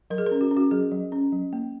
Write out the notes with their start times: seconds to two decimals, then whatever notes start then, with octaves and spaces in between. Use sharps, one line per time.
0.10 F#3 A#4
0.18 G#4
0.26 C#4 A#4
0.41 F#4
0.51 C#4
0.57 F#4
0.71 F#3 G#4
0.92 F#3
1.12 C#4
1.32 F#3
1.53 A#3